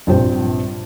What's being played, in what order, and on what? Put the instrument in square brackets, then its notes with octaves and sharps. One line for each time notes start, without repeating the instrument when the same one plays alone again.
[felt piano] A#1 G2 C3 F4 C5 G5